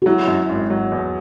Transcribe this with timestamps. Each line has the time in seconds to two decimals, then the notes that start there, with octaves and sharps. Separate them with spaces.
0.02 F#4
0.06 F#3 E4
0.27 F#2
0.49 G#1
0.70 F#3
0.92 E2